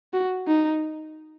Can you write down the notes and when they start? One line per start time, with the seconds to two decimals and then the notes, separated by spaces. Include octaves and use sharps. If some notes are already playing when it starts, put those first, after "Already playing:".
0.13 F#4
0.48 D#4